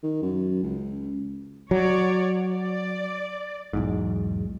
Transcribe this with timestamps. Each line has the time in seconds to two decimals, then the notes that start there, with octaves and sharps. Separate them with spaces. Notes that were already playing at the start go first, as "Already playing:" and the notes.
0.03 D#3
0.22 F#2
0.63 C#2
1.71 F#3 C#5 D5
2.52 D5
3.73 B1 E2 G#2